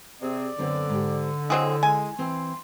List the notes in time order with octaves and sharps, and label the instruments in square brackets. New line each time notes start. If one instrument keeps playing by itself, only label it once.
[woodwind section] C3 C4 G#4 [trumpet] D5
[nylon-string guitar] F#2 B3 C4 [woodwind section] D3
[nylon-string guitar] G#2 G4
[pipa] F#3 C4 G#4 [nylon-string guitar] E4 F#5 [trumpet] D#5
[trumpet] G#3 [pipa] G#5
[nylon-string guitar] E3 C4 [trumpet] C6